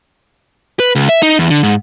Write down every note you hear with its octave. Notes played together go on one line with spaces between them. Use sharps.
B4
C#2
E5
D#4
E2
D3
G#2